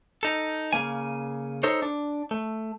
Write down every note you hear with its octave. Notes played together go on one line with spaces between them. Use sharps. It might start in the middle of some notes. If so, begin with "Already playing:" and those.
D#4 A4
C#3 A#3 G#5
D#4 A4 C5 C#5
D4
A3